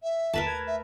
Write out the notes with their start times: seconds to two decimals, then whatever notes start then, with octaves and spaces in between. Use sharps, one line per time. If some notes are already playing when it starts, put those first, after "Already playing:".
0.03 E5
0.33 D#2 A3 A#4 B4 A5
0.46 G#6
0.67 E5